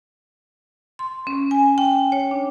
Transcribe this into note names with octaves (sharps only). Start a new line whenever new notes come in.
C6
C#4
G#5
G5
C#5
D4